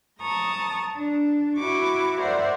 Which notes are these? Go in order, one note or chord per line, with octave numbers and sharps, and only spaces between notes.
A5 A#5 C#6 D#6
D4
E4 F#4 C#6 D6
A#4 C5 D5 E5 F#5